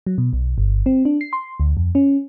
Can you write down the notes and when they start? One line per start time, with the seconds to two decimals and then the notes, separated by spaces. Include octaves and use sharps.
0.07 F#3
0.18 B2
0.33 B1
0.58 G1
0.86 C4
1.05 D4
1.21 C7
1.33 C6
1.60 D2
1.77 F2
1.95 C#4